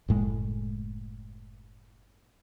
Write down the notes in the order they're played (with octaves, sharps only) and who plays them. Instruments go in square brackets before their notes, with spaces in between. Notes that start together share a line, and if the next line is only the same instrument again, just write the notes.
[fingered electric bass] F#1 A2 G#3